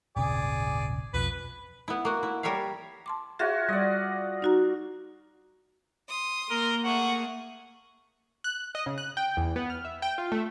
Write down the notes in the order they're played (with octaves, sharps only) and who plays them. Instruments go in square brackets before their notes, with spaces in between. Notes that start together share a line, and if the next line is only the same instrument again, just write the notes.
[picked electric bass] D#1 G#1 C#3 [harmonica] G#4 D5
[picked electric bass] B1 F2 F3 [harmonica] B4
[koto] B3 E4
A#3 F#4
E4
G3 A#4 C#5 E5 F5
[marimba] A5 C6 D6
[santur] F4 F#4 C#5 [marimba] G#4 E5 F5
[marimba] G3 [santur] D5 D#5
[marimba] D#4 F#4 A#5
[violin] C6 D#6
[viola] A#3 [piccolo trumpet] A#4 [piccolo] G7
[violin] A3 G#4 [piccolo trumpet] F#5 [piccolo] C#6
[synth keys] F#6
D#5
C#3
F#6
G5
E2
B3
F6
E5
G5
F4
A3